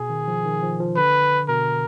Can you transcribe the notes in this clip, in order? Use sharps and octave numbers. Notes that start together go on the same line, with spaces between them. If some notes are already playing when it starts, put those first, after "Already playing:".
Already playing: B2 G#4
D#3
F3
D#3
F3
F3
D3 B4
B2 A#4